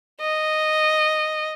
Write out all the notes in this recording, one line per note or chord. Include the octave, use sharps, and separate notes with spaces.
D#5